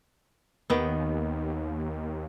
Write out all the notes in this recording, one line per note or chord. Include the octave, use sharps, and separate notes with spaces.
D#2 D#3 B3